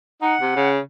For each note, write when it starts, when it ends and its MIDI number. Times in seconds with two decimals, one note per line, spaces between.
0.22 0.35 63
0.22 0.69 78
0.41 0.52 48
0.56 0.79 49